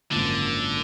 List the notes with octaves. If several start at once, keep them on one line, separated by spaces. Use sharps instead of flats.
G#1 F#2 D3 F3 A#3